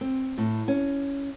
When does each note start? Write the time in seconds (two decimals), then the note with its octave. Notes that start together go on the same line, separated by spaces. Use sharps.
0.01 C4
0.38 A2
0.68 C#4